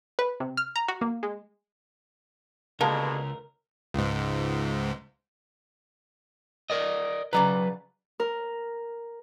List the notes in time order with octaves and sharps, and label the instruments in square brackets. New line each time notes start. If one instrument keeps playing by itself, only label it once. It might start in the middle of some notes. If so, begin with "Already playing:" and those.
[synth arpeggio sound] B4
C3
F6
A#5
F#4
A#3
G#3
[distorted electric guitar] C#2 [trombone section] B2 D3 G#3 [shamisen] A#3 G4 A4 [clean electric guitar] A#4
[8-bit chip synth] C#2 G#2
[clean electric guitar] A#4 D5 D#5
[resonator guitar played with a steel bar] C#3 D5 A#5 [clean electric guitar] F#3 B4
[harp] A#4